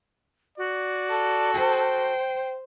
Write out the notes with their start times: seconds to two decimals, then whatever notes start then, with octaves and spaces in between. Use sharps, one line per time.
0.58 F#4 D5
1.09 A4
1.54 C5 G5